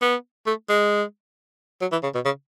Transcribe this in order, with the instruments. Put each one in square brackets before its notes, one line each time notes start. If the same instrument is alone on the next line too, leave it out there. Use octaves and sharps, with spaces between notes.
[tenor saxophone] B3
A3
G#3
F#3
E3
C#3
B2
C#3